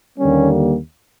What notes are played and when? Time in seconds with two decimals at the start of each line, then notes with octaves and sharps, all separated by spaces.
0.18 D#2 D3 G3 A#3 C#4